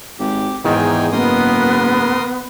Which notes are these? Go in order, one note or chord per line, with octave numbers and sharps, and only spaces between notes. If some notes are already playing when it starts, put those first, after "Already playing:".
G#1 G4
E2 G#2 D#3 D#4 G5 G#5
F#1 B3 A#4 C6 D#6